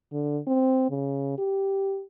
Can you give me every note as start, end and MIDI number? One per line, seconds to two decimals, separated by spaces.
0.12 0.38 50
0.47 0.88 60
0.90 1.37 49
1.38 2.02 67